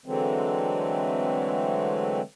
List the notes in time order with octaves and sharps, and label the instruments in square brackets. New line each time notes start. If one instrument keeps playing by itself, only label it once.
[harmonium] D3 E3 F#3 G#3 A3 C4